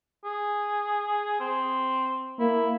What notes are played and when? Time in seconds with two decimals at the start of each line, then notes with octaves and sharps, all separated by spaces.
0.24 G#4
1.40 C4
2.39 A#3 E4